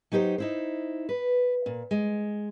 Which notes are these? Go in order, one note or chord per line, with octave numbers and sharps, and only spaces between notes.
F#3 D#4 G4 A#4 C5
D#4 E4 C5
B4
A#2
G#3